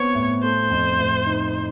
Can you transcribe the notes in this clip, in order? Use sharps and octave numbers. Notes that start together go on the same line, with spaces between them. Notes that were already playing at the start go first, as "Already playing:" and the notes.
Already playing: B3 C4 C#5
A2
A3 C5
F2
A2
D#4